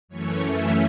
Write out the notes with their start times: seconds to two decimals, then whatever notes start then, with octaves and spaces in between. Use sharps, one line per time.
0.08 F#2 E3 A3 C#4 C#5
0.39 F#2 E3 A3 C#4 E5